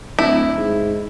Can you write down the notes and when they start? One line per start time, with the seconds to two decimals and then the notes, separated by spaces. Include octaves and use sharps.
0.19 D1 E4
0.57 G#2